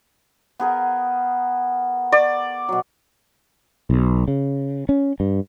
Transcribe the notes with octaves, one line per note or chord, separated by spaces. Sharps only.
B3 G#4 A#4
D5
B2 F#3
B1
C#3
C#4
G2